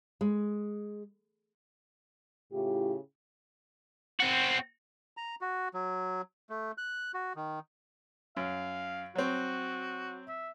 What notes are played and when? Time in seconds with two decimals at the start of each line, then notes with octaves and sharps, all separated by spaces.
0.21 G#3
2.53 A2 C#3 E4 F4 G4
4.20 C4 F#4
5.17 A#5
5.41 F#4
5.74 F#3
6.50 A3
6.78 F#6
7.14 F#4
7.36 D#3
8.37 F#2 F5
9.15 F#3 C4 F#4
10.28 E5